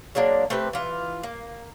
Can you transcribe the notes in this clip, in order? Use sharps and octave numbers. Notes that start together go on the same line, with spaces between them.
F#3 G#3 A#3 D4
A3 C4 G4 B4
E3 F4
A#3